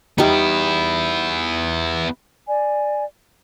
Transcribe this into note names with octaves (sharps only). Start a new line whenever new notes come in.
G3 B3 D#4 E4
D5 G#5